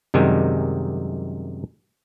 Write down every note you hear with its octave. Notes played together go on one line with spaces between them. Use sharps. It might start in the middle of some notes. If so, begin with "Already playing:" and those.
F#2 C3 D#3 G3 G#3